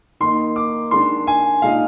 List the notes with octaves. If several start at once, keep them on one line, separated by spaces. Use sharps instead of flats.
D#3 A#3 D#4 C6
D6
D#3 G#3 D4 C6
G#5
A#2 G#3 D#4 F5